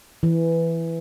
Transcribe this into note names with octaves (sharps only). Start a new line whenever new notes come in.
E3